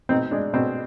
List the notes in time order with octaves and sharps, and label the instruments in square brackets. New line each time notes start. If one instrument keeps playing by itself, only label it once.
[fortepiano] B2 C4 D#4
G#3 D4
B2 C4